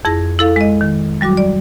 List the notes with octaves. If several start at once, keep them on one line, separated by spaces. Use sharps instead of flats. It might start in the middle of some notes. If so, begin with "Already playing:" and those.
F2 E4 G#4 G#6 A#6
E4 A4 F5
G#3 D#5
D#3
F#3 G3 F#4 D6
D5